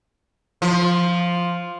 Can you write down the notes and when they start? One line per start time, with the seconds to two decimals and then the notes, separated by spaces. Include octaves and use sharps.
0.62 F3